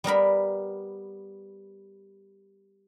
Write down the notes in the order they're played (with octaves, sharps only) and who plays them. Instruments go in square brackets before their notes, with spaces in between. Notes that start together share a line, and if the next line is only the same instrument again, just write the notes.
[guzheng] G3 B3 A#4 B5